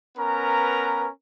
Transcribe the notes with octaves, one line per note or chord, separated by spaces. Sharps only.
B3 C#4 A#4 B4 A#5